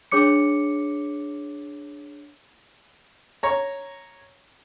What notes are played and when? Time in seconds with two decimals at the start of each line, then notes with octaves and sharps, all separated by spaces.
0.12 D4 G#4 C#5 D6 C#7
3.43 C#5 A#5